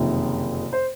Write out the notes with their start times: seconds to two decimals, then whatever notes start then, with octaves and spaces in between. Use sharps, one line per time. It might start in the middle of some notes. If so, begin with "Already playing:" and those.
Already playing: F#1 F2 C3 D#3
0.73 C5